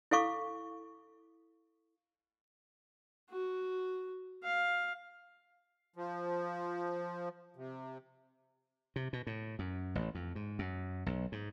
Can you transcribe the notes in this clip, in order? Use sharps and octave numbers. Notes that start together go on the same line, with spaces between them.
E4 A4 F5 C#6 D6
F#4
F5
F3
C3
C3
B2
A2
F#2
A1
F2
G#2
F#2
B1
G#2